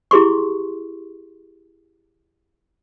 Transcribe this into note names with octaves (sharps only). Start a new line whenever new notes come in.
E4 G4 G#4 C6 C#6